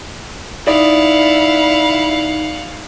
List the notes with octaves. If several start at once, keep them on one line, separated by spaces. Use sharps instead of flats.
D#4 E4 D5 F5 F#5